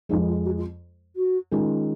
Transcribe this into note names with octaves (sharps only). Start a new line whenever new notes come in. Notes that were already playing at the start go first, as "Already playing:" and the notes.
F2 F3 G#3 D#4
F4
F#4
F4
F#4
D#3 G#3 C#4 F4 A#4